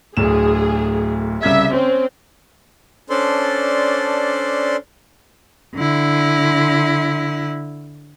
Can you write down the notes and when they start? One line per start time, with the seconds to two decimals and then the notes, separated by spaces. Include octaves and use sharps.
0.17 D1 D2 G#4 E7
1.43 C2 C#3 E5 G#6
1.73 C4 C#4
3.10 C#4 D4 A4 C5 D5 C6
5.76 D3 E4